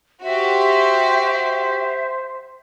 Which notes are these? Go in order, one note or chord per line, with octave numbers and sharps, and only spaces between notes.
F#4 G4 C5 E5